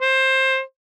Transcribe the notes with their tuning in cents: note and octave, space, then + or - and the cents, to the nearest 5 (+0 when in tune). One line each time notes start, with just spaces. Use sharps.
C5 +20